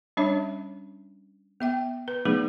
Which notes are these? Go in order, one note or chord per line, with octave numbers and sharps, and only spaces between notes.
G3 C#4 D4 C#5 E5
B3 E5 G5
B4
F#3 A3 B3 D#4 G#4 B4